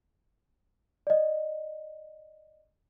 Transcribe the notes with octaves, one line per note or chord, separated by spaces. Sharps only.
D5 D#5